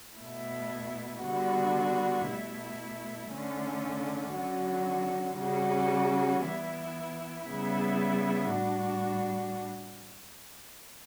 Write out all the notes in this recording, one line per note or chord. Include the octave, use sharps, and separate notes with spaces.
B2 A3 E4
D3 G3 B3 F#4
B2 A3 E4
D3 A3 C#4
D3 F#3 C#4 F#4
C#3 G3 C#4 F#4
E3 B3 E4
C#3 G3 B3 E4
A2 G3 D4 F#4